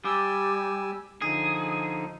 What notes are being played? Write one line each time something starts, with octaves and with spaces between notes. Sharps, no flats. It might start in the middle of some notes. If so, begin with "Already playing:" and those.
G3 G4 G#5 E6
D3 F3 D#4 G#4